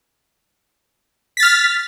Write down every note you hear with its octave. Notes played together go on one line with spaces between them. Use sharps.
F6 A6 B6